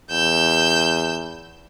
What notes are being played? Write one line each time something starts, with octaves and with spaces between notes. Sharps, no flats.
E2 E6 G6